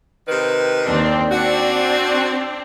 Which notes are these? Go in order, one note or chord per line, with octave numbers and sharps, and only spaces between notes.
C3 D#3 B4
D#2 C4 D4
C4 D4 F#4